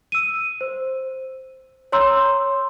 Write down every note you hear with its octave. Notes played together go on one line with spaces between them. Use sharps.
E6 D#7
C5
C#5 A#5 C6 E6 G6